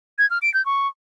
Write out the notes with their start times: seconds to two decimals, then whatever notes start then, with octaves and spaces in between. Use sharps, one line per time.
0.19 G#6
0.30 F6
0.42 D7
0.54 G6
0.66 C#6